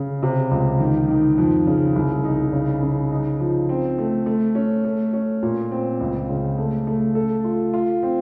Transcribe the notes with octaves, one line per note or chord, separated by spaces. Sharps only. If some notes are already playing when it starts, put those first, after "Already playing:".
Already playing: C#3
C3
C#2
D#3
D#3
F2
C#3
C2
D#4
C#3
C#3
D#4
F3
C4
A3
A3
C#4
A3
C#4
A#2
C4
C#2
C#3
A3
A3
A4
F4
F4
C4